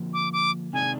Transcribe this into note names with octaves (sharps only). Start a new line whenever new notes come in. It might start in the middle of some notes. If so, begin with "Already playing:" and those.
Already playing: D3 F3 A#3
D6
D6
C3 D#3 G#3 D4 G#5